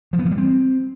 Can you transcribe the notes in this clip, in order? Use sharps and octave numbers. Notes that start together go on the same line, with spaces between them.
F3
B3
E3
G3
C4